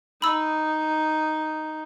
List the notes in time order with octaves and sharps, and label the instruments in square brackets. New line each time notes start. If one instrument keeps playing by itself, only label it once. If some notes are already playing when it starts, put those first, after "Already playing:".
[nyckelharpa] D#4 [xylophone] B5 E6